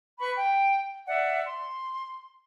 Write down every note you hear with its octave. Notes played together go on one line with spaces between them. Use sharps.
B4 B5 C#6
G5
D5 E5 F#5
C6